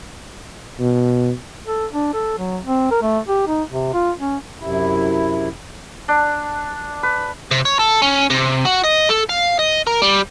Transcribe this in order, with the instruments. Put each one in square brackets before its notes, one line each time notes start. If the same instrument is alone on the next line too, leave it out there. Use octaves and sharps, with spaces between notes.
[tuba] B2
[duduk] A4
D4
A4
F#3
C4
A#4
A3
G4
D#4
C3
F4
C#4
[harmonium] F#2 C3 E4
[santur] D4
B4
[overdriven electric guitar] C3
C#5
A4
C#4
C3
F#4
D#5
A4
F5
D#5
A#4
G3